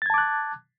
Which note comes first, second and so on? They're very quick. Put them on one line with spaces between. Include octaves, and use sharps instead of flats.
A6 G#6 A5 D6 F#6